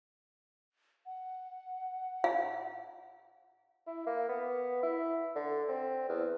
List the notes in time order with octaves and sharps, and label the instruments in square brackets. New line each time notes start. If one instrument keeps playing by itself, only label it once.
[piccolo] F#5
[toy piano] F5
[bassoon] E4
A#3
B3
E4
D3
C4
E2